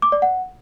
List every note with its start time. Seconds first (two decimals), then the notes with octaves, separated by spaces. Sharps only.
0.02 D6
0.12 D5
0.22 F#5